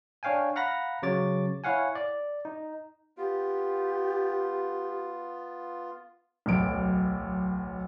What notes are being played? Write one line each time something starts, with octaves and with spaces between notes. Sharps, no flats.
D4 C#5 F5 G5 G#5
F5 F#5 A#5 B5 A#6
C#3 F#3 C#5 D6 A6
E4 C#5 F5 F#5 G#5
D5
D#4
B3 F4 G4
D1 B1 D7